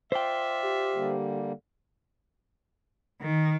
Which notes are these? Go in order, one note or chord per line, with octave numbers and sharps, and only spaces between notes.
F4 C5 D5 E5 G5
G4
D3 G3 A#3
D#3